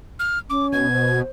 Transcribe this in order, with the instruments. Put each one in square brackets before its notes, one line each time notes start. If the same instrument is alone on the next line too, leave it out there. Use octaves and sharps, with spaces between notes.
[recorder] F6
[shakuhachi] C#4 [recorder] D6
[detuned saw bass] B2 [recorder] G#6
[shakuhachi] C5